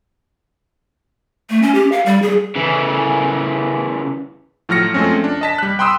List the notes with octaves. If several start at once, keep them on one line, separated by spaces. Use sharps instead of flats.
A3
C#4
G4
F5
G3
G#4
C#3 E3
A2 F3 F#3 F6 A#6 C#7
F3 G#3 A3 C4 C#4
D4
D#5 A5 B6
G3 F#6
G5 B5 C6 D#6 E6